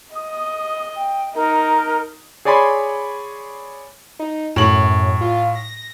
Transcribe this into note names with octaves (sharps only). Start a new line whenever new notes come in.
D#5 D#6
G5
D#4 A#4 A#5
G#4 C#5 D5 G#5 B5 C6
D#4
F#2 A2 F#7
F4
A#6